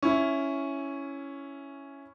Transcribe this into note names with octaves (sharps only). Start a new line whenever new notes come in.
C#4 E4